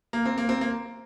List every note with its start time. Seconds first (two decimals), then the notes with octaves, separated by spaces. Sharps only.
0.13 A#3
0.25 C4
0.38 A#3
0.49 C4
0.61 A#3